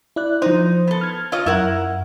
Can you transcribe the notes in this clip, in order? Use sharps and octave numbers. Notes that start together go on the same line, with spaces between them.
E4 D5 F#6
F3 D#4 C5
B3 A4
F6 G#6
F4 C#5 D#5
F#2 E4 A#4 F#5